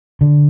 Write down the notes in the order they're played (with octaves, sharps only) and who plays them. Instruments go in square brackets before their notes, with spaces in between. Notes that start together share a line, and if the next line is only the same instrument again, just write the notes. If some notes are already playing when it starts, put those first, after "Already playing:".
[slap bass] D3